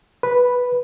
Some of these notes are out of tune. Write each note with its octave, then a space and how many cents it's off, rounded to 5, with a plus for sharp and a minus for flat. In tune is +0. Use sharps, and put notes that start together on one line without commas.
B4 -5 B5 +0